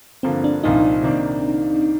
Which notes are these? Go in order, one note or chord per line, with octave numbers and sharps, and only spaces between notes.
G2 D3 F3 A#3 C4
D4
C2 A#2 F3 D#4
C3 D#3 A#3 D4